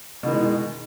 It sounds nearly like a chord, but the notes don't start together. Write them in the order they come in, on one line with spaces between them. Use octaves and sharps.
B2 D#3 E3 G#3